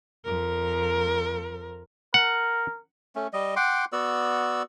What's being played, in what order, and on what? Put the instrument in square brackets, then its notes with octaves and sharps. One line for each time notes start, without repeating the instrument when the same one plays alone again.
[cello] F2 A#4
[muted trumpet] A#4 [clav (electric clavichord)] F#5
[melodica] A3 C#4
G3 D#5
F#5 G5 C6 D6
B3 F#4 D5 E6